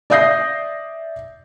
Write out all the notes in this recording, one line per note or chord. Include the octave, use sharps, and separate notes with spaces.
D5 E5 D#6 G6 A#6 C7